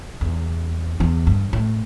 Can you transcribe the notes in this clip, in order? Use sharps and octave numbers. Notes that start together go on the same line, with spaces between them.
E2
E2
G2
A2